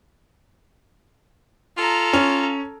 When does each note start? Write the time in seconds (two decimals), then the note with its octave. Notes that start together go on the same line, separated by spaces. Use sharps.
1.77 F4 A4 A#5
2.13 C#4